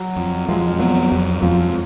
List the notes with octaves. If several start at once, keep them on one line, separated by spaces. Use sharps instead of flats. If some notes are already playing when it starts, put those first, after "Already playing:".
Already playing: F#3
F2
F2 F3 G#3
F#3 B3
F2 F#3
F2 F3 G#3